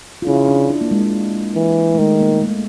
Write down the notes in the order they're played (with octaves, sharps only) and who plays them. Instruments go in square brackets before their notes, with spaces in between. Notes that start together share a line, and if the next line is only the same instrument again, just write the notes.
[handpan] F4
[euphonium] C#3 [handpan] E4
[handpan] D4
D4
A#3
G#3
G#3
[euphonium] E3
[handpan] A3
[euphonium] D#3 [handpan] G#3
[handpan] A#3
A3